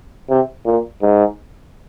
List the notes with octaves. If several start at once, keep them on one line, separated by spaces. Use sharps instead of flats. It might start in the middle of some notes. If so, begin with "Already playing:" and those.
C3
A#2
G#2